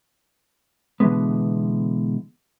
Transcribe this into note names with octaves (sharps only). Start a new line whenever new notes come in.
B2 D3 E3 F#3 G#3 B3